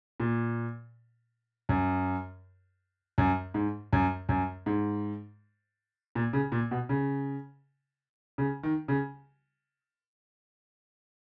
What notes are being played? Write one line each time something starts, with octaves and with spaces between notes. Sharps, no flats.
A#2
F#2
F#2
G#2
F#2
F#2
G#2
A#2
C#3
A#2
B2
C#3
C#3
D#3
C#3